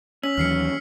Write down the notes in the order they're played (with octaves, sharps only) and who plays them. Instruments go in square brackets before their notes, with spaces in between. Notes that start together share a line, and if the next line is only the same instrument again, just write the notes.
[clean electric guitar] C#4 [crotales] E6 B6 F#7
[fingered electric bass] D#2 E3 F#3 [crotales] F6 C7 C#7